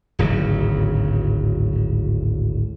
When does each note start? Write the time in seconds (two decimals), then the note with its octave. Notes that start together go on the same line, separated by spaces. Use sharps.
0.19 D1 G#1 C#3 F#3